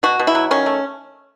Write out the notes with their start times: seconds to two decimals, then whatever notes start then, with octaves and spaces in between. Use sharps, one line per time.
0.03 B2 F#4
0.19 B2
0.27 E4
0.35 F#3
0.51 D#3 C#4
0.66 A3